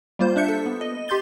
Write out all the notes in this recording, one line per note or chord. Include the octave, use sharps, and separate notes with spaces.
G3 A#3 F4 C5 G6
D4 E5 G6 C#7
A4
B3
D#5
G4 C6 G6 A6 G7